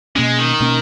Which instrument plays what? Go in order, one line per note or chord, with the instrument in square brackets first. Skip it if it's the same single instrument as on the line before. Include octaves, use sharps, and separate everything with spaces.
[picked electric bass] B2 A#3 C#4 [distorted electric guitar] G#3
[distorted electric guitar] D#3
[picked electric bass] B2 A#3 C#4